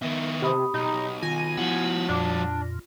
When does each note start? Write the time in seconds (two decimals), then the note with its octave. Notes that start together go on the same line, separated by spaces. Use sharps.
0.02 D#3 B3 E4
0.42 C3 G4 B5 D#6
0.74 B1 D#4
1.22 D#3 F4 G#5
1.58 F3 B3 E4 F#4
2.08 F2 A#2 D4